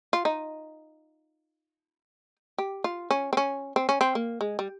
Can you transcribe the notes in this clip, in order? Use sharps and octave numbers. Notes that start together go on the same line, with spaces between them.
F4
D#4
G4
F4
C#4
C4
C#4
C4
C#4
C4
A#3
G#3
G3